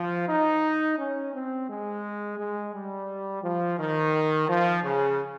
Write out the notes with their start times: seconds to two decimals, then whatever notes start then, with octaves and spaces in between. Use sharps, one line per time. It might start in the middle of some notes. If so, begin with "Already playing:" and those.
Already playing: F3
0.28 D#4
0.98 C#4
1.34 C4
1.69 G#3
2.38 G#3
2.73 G3
3.42 F3
3.78 D#3
4.48 F3
4.83 C#3